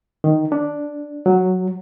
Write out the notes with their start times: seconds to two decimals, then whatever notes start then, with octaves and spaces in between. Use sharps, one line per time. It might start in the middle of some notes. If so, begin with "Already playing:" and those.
0.24 D#3
0.52 D4
1.26 F#3